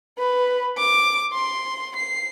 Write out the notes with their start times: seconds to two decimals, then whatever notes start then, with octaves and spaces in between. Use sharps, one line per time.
0.18 B4
0.77 D6
1.33 C6
1.95 C7